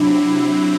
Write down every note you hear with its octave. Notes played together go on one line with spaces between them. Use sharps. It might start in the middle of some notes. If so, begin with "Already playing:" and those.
Already playing: C3 F#3 C4 D4 E4